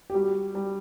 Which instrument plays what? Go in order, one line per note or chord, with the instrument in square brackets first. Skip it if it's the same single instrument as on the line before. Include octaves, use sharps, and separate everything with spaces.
[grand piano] G4
[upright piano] G3 [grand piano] F#4
[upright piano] G3